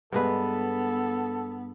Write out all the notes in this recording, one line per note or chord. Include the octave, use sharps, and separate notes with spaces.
G2 G#3 B3 A4 B4